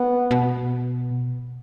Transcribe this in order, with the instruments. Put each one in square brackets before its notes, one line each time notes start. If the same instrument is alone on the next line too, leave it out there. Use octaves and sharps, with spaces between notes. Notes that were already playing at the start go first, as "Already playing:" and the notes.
Already playing: [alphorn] B3
[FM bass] B2